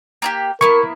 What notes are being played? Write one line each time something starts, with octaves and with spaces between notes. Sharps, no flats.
A#3 F4 G4
A#3 B3 E4 A#4 C#6